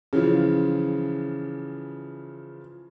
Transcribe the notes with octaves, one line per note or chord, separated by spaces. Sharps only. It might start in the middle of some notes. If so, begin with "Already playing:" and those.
C#3 E3 F3